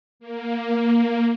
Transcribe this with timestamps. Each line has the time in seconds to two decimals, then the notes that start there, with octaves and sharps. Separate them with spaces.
0.20 A#3